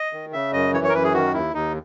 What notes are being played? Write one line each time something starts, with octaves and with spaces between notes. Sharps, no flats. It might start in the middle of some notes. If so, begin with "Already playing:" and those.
Already playing: D#5
D#3
C#3 E5
F#2 D#5
E3 C#5
C#5
A#4
F#2 B4
G#4
D#3 F#4
D#2 E4
D#2 D#4